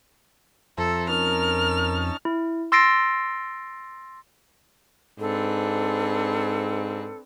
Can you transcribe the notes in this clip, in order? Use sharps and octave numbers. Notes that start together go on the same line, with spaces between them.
F2 A4 C5 E5 A#5
C#4 D#4 A#4 A5 F6
E4
C6 E6 A6 A#6 C7 D7
G#2 C4 D4 A4 B4